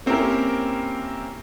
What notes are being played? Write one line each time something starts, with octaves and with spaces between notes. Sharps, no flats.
A#3 C4 C#4 E4 G4 A#4